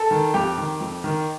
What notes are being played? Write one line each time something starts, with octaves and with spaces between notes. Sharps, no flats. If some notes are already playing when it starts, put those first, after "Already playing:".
Already playing: A4 A5
D#3
F2 G4 G5
D#3
F2
D#3